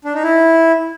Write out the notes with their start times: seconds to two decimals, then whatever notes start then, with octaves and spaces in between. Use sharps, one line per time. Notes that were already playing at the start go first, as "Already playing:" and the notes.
0.04 D4
0.14 D#4
0.24 E4